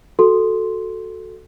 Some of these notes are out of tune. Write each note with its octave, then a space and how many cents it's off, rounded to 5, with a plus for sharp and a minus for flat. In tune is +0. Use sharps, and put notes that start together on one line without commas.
F#4 +0 A4 +0 C6 +0